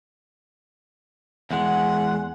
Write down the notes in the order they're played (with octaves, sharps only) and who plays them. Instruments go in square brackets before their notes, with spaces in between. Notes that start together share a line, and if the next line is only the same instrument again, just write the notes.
[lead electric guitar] E2 G#3 [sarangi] F#5